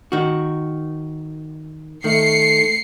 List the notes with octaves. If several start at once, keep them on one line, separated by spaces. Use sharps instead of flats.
D#3 F#4
D#3 A3 C7 C#7